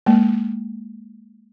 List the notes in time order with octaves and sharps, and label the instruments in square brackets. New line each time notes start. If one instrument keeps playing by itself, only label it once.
[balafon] G#3 A#3